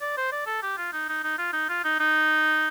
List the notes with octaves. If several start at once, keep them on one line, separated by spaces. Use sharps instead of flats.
D5
C5
D5
A4
G4
F4
D#4
D#4
D#4
F4
D#4
F4
D#4
D#4